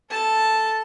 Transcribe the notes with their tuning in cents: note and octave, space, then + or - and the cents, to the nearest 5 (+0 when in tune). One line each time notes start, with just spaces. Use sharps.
A4 +0 A5 +0